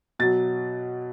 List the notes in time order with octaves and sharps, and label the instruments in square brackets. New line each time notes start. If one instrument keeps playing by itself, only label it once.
[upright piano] B2 F#3 A6